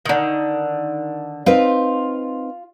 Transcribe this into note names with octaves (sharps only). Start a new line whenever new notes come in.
D3 D#3
C4 D#4 F4 B4